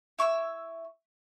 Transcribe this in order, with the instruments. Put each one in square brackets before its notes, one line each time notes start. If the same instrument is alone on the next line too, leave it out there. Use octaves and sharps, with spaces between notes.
[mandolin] E4 C#6 D#6 E6